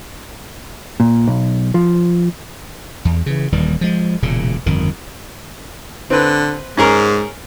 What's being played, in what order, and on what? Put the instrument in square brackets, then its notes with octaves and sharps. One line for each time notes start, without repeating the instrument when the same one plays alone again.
[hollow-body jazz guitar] A#2
B1
F3
[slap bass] E2
C#3 E3
D#1 D#2 E3 G3
F3 G#3
E1 A#2 C#3
G1 F2 D#3
[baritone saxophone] D3 [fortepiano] C4 B4
[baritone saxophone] G#2 [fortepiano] C#4 G#4 A#4